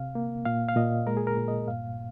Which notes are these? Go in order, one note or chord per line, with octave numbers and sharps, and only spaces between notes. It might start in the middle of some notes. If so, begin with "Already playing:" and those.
Already playing: C3 F5
A#3
A#2 F5
F5
A#2 D#5
G#3 A#4
G#4
A#4
A#2
D#5
G2 F5